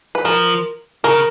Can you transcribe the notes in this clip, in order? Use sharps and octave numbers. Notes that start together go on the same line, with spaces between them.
B4
F3 A#4
C#3 A#4